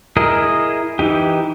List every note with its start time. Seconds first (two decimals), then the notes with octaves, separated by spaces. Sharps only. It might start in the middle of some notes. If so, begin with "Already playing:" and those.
0.17 E4 G#4 A#4 D#5
0.99 E3 D#4 G4